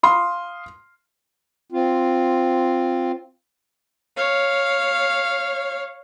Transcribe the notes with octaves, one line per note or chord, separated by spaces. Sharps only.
F5 C6 D#6
C4 F4
C#5 F5